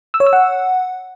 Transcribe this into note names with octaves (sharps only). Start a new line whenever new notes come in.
E6
C#5
E6
F#5